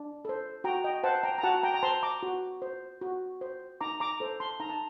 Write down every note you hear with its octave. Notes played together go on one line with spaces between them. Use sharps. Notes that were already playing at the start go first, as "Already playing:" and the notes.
Already playing: D4
A4 C5
F#4 G5 A#5
D#5 G5
C5 F#5 A5
G5 A#5
A#5
F#4 F#5 A5
G5 A#5
A#5
C5 A5 C6
A#5 D6
F#4
C5
F#4
C5
D#4 A#5 D6
A#5 D6
A4 C5
A5 C6
D#4 A#5
A5